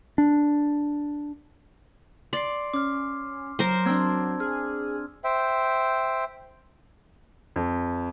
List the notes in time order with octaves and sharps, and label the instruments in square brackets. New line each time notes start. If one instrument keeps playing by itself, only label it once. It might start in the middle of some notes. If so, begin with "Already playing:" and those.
[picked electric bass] D4
[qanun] D5 [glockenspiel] C6 C7
[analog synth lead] C#4 [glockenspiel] D6 F6
[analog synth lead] F#3 [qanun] A#4 C5
[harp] C4 D4 [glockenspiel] C6 E6 G#6
[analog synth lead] G#4 [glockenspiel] F6
[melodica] C5 E5 G5
[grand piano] F2